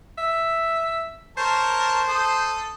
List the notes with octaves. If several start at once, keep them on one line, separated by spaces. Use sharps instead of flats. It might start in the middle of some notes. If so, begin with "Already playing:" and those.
E5
A#4 C5 C#5 A5
A4 D#6